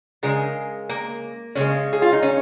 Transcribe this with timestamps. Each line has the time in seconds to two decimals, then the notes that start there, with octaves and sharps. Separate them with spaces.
0.23 C#3 G#3 A#4
0.89 A#3
1.55 C#3 G#3 C#4
1.93 G#4
2.02 F4
2.13 D#4
2.22 C#4